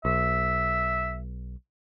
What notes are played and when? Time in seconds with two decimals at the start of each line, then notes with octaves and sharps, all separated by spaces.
0.05 B1 E5